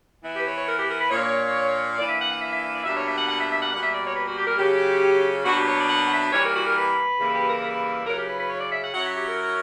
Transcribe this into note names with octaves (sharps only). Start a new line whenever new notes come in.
E3 B3 E4
G4
B4
C#5
C#5
A#4
G4
A#4
B4
A#2 A#3 D4 C#5
E3 A#3 D4 D5
E5
F#5
F#5
E5
E5
E5
D5
B2 G3 A#3 D4 E5
C#5
E5
F#5
F#5
E5
E5
F#5
B2 G3 A#3 F#5
E5
D5
C#5
B4
F#4
G4
A#4
C#3 F#3 C#4 G4
B2 F#3 A#3 D4 F#4
G4
C#5
D5
F#5
F#5
E5
E3 G3 A#3 C#5
A#4
F#4
A#4
B4
C#3 E3 G3 A#3 E4
G4
A#4
B4
C#3 F#3 C#4 E4 A#4
G4
B4
B4
C#5
D5
E5
F#5
F#3 C#4 E4 F#5
E5
G4
A#4